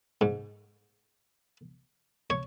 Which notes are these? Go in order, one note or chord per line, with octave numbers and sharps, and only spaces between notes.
G#2
C#5